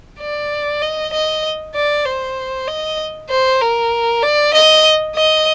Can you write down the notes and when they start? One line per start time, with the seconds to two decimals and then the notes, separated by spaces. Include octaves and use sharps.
0.20 D5
0.82 D#5
1.13 D#5
1.75 D5
2.05 C5
2.68 D#5
3.30 C5
3.61 A#4
4.23 D5
4.54 D#5
5.16 D#5